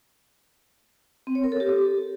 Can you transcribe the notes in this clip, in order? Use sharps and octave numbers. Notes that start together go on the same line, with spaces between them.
C4
C#5
A#4
A4
G4